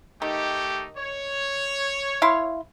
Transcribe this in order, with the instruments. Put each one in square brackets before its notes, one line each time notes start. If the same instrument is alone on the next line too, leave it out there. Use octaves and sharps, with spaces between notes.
[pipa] D#3 [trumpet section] A3 D#4 G4
[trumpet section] C#5
[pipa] E4 F5 C6